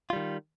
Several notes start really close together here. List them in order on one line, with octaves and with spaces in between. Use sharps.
F4 G3 D#3